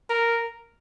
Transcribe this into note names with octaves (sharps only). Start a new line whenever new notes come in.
A#4